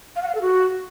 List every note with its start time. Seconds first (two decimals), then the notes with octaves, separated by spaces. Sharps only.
0.16 F5
0.22 F#5
0.29 F5
0.35 A4
0.41 F#4